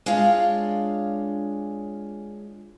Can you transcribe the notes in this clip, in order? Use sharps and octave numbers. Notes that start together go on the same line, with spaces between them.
G#3 D4 F4 C#5 F5